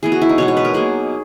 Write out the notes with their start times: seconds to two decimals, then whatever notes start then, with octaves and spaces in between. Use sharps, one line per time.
0.03 E3 B3 G#4
0.12 F#4
0.22 E4
0.29 D#4
0.38 B2 G#3 B3 C#5
0.48 C#5
0.57 B4
0.65 A#4
0.74 B2 F#3 A#3 G#4